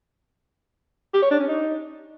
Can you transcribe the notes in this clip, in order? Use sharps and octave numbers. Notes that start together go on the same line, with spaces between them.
G4
C#5
D4
C#4
D#4